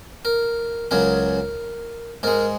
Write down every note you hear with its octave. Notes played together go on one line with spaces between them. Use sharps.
A#4
C#2 C#3 F#3 A#4
G#2 G#3 A#4